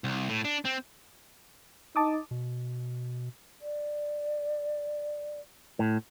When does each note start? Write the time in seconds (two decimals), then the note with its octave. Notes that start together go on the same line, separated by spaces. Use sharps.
0.04 C2
0.29 A2
0.45 D4
0.65 C4
1.96 D#4 A5 D6 D#6
2.31 B2
3.61 D5
5.79 A2